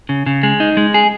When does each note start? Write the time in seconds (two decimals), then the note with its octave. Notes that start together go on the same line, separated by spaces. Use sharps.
0.09 C#3
0.26 C#3
0.43 G#3
0.60 D#4
0.77 G#3
0.94 G#4